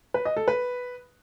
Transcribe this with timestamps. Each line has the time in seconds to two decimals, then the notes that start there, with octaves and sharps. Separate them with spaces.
0.14 B4
0.25 D#5
0.37 A4
0.48 B4